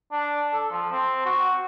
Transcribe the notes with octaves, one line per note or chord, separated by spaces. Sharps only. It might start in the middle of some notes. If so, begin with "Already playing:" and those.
D4
A4
F3
C4
F#4